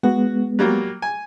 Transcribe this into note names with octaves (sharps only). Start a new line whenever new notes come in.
G#3 B3 F#4
F#3 G3 A#3
G#5